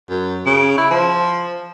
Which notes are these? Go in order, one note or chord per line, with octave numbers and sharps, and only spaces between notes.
F#2
C#3
E4
F3